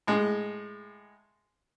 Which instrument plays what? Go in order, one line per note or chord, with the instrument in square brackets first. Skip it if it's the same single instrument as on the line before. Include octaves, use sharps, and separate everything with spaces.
[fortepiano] A2 G#3